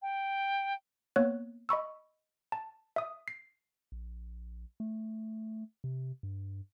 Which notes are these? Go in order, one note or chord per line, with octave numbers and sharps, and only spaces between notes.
G5
A#3 B3 C#5 F#6
D#5 B5 C#6 E6
A5
E5 D#6
C7
A#1
A3
C3
G2